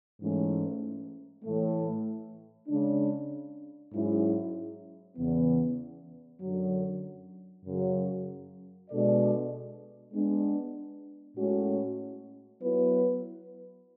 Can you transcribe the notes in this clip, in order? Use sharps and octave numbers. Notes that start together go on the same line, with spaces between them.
G#2 E3 A3 C#4
A2 E3 A3
C#3 G#3 D4
G#2 F#3 C#4 E4 G#4
E2 C#3 E3 B3
F#2 D3 F#3
F#2 C#3 F#3
B2 G#3 D4 A4 D5
G#3 B3 D4
A2 G#3 C#4 F#4
F#3 B3 E4 B4